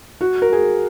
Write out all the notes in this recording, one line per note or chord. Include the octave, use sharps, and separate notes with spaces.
F#4
A#4
G#4